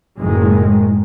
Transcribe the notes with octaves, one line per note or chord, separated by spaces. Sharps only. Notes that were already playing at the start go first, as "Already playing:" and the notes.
F#1 A2 D#3 G#3